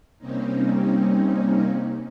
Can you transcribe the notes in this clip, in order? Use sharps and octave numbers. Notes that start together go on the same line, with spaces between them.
C3 G3 A#3 C4 C#4 D#4